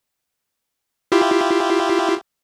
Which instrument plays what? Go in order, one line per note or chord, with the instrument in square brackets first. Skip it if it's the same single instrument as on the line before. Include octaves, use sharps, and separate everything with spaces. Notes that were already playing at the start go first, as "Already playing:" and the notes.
[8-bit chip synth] E4 F4 G4